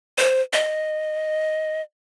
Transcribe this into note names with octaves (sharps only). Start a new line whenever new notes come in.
C5
D#5